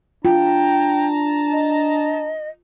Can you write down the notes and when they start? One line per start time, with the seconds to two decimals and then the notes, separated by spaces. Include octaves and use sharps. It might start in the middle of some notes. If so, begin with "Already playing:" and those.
0.25 D4 F4 G5 A5 A#5
1.52 D#5